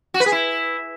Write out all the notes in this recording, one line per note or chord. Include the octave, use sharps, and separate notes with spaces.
F#4
B4
G#4
E4